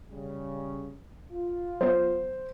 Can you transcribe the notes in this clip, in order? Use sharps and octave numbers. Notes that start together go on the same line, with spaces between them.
C#3 G3
F4
F#3 B3 C5